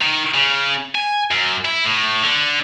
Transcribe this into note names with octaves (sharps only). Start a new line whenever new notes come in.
D#3
C#3
G#5
F#2
E4
A2
D3